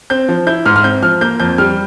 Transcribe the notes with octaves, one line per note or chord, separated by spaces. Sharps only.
C4 G6
F3
E4 G6
G#2 F6
F6
C4 G6
F3 F6
A#3 G6
F2 G6
G3 F6